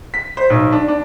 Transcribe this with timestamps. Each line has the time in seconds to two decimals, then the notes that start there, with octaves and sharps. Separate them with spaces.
0.14 B6
0.37 C5
0.50 B1
0.72 D4
0.88 D4